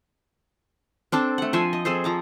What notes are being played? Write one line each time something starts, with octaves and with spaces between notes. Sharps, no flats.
C4 D4 A4 D6
A3 F#5
F3 C5 E5 G#5
D#5
C4 G#4 A4 C5
F3 A#5 D6